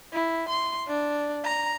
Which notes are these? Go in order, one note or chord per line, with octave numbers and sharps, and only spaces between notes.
E4
C6
D4
A#5